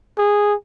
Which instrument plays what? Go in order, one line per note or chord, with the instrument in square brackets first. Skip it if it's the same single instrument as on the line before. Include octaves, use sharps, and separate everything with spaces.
[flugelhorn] G#4